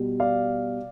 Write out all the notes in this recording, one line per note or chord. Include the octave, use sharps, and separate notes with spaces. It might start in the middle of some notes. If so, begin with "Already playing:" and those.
Already playing: B2 G3
D5 F5